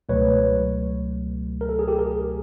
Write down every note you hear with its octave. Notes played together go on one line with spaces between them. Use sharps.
C#2 B2 F#3 A3 B4 C#5
A#4
A4
G#4
G4 A4
G#4 A#4